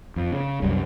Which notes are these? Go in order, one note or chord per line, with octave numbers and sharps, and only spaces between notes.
F2
C#3
C2 F#2 G3